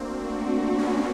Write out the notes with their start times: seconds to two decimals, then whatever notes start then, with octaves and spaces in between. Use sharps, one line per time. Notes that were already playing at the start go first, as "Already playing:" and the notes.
Already playing: A3 A#3 C4 D4 F#4
0.78 B3 C#4